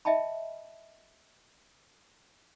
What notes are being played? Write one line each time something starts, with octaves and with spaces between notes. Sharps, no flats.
D#5 E5 G5 A5 B5